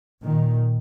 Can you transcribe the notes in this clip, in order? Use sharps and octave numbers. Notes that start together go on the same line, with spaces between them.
A#2 D#3